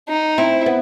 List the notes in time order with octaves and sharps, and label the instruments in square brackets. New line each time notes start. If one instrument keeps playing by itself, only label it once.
[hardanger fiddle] D#4
[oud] C4 [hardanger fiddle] E4
[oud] B3